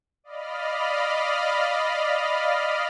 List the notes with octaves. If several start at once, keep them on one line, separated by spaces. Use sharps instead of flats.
D5 D#5 F5 B5 F6